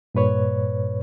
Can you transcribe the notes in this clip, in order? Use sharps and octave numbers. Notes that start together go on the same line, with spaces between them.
G2 A#2 B4 C#5